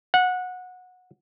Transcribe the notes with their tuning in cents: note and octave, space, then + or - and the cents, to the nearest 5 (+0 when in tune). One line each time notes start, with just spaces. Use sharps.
F#5 -20